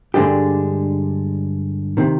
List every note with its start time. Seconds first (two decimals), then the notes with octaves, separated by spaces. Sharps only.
0.14 G2 D3 G#3 D4 G4
1.97 C3 D#3